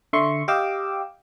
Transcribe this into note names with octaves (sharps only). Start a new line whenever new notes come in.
D3 E5 C6 C#6
G4 D#5 F5 G5 D6 E6